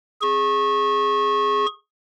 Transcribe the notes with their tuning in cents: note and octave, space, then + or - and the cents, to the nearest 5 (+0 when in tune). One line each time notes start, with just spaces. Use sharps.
G#4 +0 C#6 -25